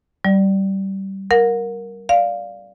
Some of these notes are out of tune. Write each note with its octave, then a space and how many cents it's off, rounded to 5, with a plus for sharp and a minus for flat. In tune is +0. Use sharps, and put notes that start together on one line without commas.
G3 -20 D5 +5
A#4 +5 F#5 -35
D5 -5 F5 +0